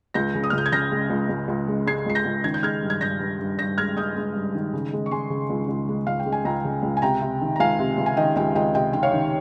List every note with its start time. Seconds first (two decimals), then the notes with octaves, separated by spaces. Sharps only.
0.14 C#2 G6 A#6
0.35 C#3
0.44 D#6
0.50 F6
0.53 C#2 G6
0.66 G#6
0.72 C#3 G6 A#6
0.91 G#3
1.10 C#2
1.29 C#2
1.48 C#2
1.68 G#3
1.87 G#3 G#6 C7
2.06 C#2 C7
2.15 G6 A#6
2.25 C#2
2.44 D#3 G#6
2.54 G6
2.63 G#3 F6 G#6
2.83 G2
2.90 G#6
3.01 G2 G6 A#6
3.20 G2
3.39 G2
3.59 G2 G6 A#6
3.78 G#3 F6 G#6
3.97 G#3 D#6 G6
4.16 G#3
4.35 G2
4.54 D#3
4.73 C#3
4.93 G#3
5.06 C#6
5.11 G#3 G#5 C6
5.30 C#3
5.50 C#2
5.68 C#2
5.89 G#3
6.07 C#2 F5
6.19 G5
6.26 G#3
6.32 G#5
6.45 C#2 G5 A#5
6.65 C#3
6.83 C#2
6.97 G#5
7.02 C3 G5 A#5
7.22 C3
7.41 D#3
7.56 A#5
7.60 C#2 F5 G#5
7.79 C3
7.98 C#2
8.06 G#5
8.17 D#3 D#5 G5
8.36 C#2 D#5 G5
8.55 C#2 D#5 G5
8.75 C3 D#5 G5
8.93 D#3 G5
9.03 C#5 F5
9.13 D#3